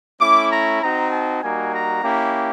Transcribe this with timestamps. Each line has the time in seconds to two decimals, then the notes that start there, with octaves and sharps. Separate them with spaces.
0.20 A3 C#4 E4 D6
0.50 A#5
0.80 C4 D#4 F#4 A#5
1.11 A5
1.41 G3 A#3 D#4 F#4 G#5
1.72 A#5
2.02 A#3 C#4 E4 G4